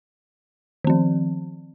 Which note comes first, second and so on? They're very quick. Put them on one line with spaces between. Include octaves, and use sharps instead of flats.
D#3 C4 F3